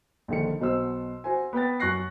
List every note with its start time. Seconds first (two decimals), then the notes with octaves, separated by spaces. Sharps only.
0.28 A#1 D3 D#3 C#7
0.60 B1 B2 C5 E6
1.24 F#4 C5 G#5
1.53 B3 B4 G5 A6
1.80 F#2 C#6 F#6 A#6 C7